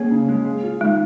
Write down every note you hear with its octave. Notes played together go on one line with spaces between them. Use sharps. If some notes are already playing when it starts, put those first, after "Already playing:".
Already playing: A#3 C#4 G#4
C#3
G#3
G#4
F4
D#3 G#3